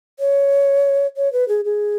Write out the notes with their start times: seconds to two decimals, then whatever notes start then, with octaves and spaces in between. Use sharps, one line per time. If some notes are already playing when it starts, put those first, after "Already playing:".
0.19 C#5
1.17 C#5
1.33 B4
1.48 G#4
1.65 G#4